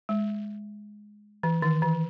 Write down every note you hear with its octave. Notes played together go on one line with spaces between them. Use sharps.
G#3
E3
D#3
E3